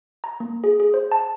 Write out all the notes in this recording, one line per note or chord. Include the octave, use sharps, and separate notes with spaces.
A#5
A#3
G#4
G#4
C5
A5